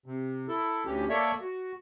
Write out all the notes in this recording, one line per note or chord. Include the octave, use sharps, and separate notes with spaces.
C3
E4 A4
D2 E3 C#4 G4
A#3 A4 C#5 D5 E5
F#4